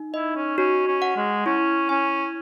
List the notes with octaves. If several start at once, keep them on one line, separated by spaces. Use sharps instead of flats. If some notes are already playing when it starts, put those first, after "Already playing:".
Already playing: D#4
E4 D#5
C#4
C#4 F#4
C#4
F#5
G#3
C#4 E4
C#4 G#5